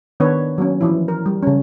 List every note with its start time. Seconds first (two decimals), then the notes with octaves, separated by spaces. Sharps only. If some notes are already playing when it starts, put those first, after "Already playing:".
0.20 D#3 B3 D4 B4 C#5
0.58 F#3 A#3 C#4
0.81 E3 F3 E4
1.08 A#4
1.26 G3
1.43 C#3 C#4